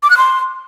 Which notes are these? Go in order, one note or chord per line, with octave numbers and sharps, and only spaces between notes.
D6
F#6
C6